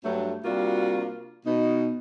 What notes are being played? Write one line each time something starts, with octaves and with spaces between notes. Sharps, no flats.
G2 F#3 A3
C3 G3 A#3 D4 F4 F#4
B2 D#4